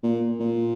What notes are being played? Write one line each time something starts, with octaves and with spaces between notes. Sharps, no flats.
A#2
A#2